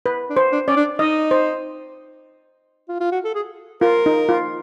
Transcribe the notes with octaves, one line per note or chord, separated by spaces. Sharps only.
B4
D4
C5
D4
C#4 D5
D4
D#4 D#5
C5
F4
F4
F#4
A4
G#4
F4 A#4
D#4
F4